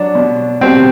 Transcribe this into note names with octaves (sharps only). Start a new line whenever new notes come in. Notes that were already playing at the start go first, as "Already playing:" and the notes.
Already playing: F#3 D4
B2
B2 C4